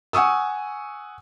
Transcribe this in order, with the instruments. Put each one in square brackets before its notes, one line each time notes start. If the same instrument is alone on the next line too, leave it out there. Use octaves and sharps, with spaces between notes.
[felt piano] F#5 G#5 C#6 D#6 E6